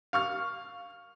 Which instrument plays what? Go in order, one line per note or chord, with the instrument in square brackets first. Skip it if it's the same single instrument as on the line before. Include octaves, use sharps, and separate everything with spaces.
[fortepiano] F5 C#6 F6